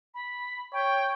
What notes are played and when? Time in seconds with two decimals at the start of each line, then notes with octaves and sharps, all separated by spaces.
0.14 B5
0.73 C#5 G5